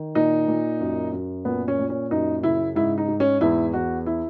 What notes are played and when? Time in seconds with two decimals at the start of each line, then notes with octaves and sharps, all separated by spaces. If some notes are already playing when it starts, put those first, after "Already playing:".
Already playing: D#3
0.15 A#2 D#4
0.48 A#2
0.81 F#2
1.13 F#2
1.45 A#2 B3
1.68 C#4
1.79 A#2
1.90 C#4
2.11 F#2 D#4
2.43 C#3 E4
2.75 G#2 E4
2.98 D#4
3.08 G#2
3.20 C#4
3.41 E2 E4
3.73 E2 F#4
4.06 E4